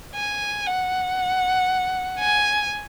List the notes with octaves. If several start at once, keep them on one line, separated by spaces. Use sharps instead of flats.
G#5
F#5
G#5